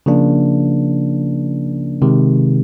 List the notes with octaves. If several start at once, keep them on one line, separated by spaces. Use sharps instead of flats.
C#3 F3 A#3 D4
C3 D#3 G#3